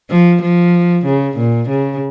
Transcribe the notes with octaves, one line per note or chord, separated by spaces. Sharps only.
F3
F3
C#3
A#2
C#3